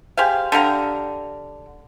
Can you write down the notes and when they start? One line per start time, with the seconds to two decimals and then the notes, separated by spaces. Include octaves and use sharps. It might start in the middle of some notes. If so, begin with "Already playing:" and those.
0.17 G4 G#4 C5 F5
0.52 D3 G4 F5 A#5